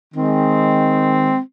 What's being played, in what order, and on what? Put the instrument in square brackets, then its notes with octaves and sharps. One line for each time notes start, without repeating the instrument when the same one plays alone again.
[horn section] D#3 G#3 C4